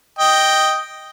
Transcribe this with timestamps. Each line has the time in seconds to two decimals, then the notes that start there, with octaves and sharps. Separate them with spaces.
0.19 D#5 G5